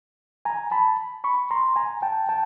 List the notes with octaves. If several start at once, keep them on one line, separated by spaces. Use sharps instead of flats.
G#5 A#5
A5 B5
B5 C#6
A#5 C6
G#5 A#5
G5 A5
G5 A5